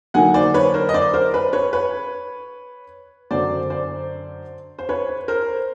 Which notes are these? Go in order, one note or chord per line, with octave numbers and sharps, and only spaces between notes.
D3 F#3 A#3 D#4 F#5 G#5
C5 D5
B4 C#5
A#4 C5
D#5
C5 D5
A#4 C5
B4
B4 C#5
B4 C#5
F#2 D3 F#3 C5 D5
C5 D5
C5
B4 C#5
A#4 C5